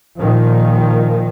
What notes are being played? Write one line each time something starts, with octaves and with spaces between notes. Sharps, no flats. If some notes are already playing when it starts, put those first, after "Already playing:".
A#2 D#3 F3